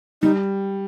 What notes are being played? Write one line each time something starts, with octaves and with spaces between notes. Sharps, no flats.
G3 D#4